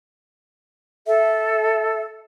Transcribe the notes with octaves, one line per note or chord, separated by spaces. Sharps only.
A4 E5